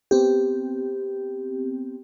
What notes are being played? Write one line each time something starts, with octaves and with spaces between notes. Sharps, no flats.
B3 C4 G4